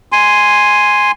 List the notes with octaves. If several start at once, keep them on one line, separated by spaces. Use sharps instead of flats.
G#5 C6